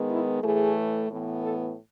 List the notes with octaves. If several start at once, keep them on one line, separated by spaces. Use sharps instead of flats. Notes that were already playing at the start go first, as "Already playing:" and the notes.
Already playing: D#3 G#3 B3
E4
A2 E3 A3 G#4
A2 E3 B3
A4